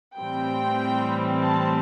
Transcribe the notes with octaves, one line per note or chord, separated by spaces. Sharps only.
A2 E3 G3 C4 G5
A5